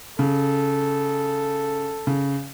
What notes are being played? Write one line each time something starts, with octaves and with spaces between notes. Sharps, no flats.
C#3 A4
C#3